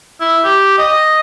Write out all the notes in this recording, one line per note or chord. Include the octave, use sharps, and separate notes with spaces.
E4
G4
D#5